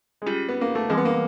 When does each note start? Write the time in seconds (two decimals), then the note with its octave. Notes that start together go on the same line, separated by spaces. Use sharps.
0.22 G#3
0.26 G3 C#4 F4 G#4
0.49 B3
0.61 A#3
0.75 A3
0.90 E3 G3 G#3 C4
0.97 B3
1.05 A#3